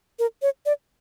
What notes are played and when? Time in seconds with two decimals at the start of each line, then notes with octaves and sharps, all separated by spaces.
0.19 A#4
0.42 C#5
0.66 D5